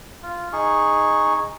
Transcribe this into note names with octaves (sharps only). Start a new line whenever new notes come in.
F4
D#4 G#4 C#6